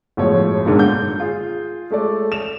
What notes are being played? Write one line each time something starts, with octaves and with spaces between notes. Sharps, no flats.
G1 A2 F3 F#3 G#3 C#5
G#2 B2 D3 D#3 G#3 A#3
G6
F4 G#4
G#3 A3 A4 D5
E7 F7